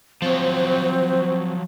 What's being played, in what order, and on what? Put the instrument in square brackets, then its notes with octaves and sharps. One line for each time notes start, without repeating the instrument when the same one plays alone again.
[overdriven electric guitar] F3 F#3 [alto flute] C4 [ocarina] C5